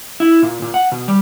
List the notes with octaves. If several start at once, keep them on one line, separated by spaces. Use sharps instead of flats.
E4
A#2
A#2
F#5
B2
G3